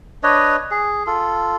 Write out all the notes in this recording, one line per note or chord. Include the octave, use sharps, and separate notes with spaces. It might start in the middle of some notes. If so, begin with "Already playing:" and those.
D4 B4 C#5 D#5
G#4
F4 A4